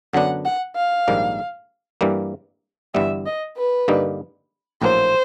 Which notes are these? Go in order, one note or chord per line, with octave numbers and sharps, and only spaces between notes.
F#2 D3 F#3 B3 D4 F#5
F#5
F5
A#1 G#2 D#3 G3 A#3
G2 E3 G3 A#3
G1 G2 E3 G3 B3 E5
D#5
B4
G2 D3 G3 A#3 D#4
A#1 A2 F#3 A#3 C5